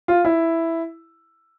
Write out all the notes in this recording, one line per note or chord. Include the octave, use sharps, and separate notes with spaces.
F4
E4